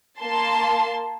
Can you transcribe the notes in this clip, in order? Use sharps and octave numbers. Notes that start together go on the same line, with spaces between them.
A#3 A5 C6